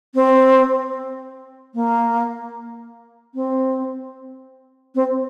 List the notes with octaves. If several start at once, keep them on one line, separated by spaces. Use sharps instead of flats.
C4
A#3
C4
C4